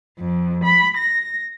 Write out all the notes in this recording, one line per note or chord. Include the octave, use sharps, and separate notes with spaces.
F2
B5
A#6